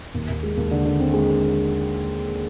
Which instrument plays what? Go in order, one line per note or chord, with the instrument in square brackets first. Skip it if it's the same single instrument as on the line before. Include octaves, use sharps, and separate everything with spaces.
[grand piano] D#2
D#2
G#3
D#2
D3
D3
C4
G#3